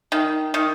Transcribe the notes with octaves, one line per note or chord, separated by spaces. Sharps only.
D#3
D#3